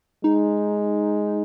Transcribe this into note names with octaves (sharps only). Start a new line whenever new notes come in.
G#3 D#4